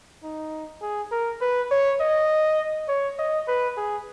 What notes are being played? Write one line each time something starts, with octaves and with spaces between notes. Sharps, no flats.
D#4
G#4
A#4
B4
C#5
D#5
C#5
D#5
B4
G#4